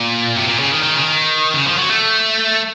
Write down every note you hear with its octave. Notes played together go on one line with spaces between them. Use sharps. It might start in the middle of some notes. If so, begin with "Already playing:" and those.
Already playing: A#2
C3
A#2
C#3
D#3
D#3
C#3
D#3
C#3
F3
F#3
A3